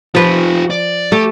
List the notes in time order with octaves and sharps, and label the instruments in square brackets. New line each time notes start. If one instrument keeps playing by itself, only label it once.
[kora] F3 B4 [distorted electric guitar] F4 G4
[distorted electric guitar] D5
[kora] A3 [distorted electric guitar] G4